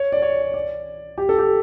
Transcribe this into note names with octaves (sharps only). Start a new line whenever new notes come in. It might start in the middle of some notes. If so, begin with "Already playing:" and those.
Already playing: C#5
D5
C#5
D5
G4
A4
G4